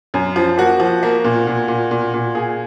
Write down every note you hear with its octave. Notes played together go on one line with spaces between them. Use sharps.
F#2
F3
A#3 F#4
F3
A#3
A#2
A#2
A#2
A#2
A#2
A#2 G#4